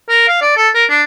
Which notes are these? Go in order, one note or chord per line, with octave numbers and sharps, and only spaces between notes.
A#4
F5
D5
A4
A#4
D4